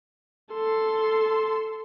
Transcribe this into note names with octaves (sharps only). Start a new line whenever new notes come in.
A4 C6